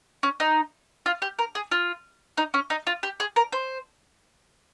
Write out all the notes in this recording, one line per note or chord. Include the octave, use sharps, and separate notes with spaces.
C#4
D#4
F4
G4
A#4
G#4
F4
D#4
C#4
D#4
F4
G4
G#4
A#4
C5